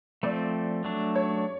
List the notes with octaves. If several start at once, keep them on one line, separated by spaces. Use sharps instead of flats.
F3 A3 C4 D5
F#3 A3 D4
C#5